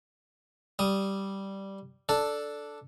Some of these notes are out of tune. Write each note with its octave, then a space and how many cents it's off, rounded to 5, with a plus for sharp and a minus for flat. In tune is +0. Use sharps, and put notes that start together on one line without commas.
G3 -5 D#6 +5
D4 +0 A4 +0